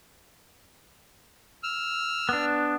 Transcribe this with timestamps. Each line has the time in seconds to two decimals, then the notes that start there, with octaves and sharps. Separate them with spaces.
1.63 E6 F6
2.29 B3 D4